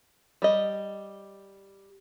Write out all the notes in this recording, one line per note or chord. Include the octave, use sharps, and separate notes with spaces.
G3 D#5